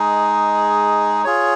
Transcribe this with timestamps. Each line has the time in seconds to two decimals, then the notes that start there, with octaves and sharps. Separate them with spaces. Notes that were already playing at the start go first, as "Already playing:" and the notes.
Already playing: G#3 D#4 G#4
1.24 F4 G#4 C#5